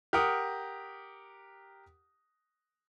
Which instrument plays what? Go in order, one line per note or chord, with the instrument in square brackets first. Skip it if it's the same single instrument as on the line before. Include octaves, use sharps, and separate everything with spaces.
[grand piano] G4 A#4 F#5 D#6